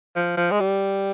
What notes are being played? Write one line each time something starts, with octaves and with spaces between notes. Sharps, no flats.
F3
F3
G#3
G3